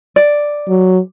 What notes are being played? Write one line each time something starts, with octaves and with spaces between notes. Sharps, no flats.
D5
F#3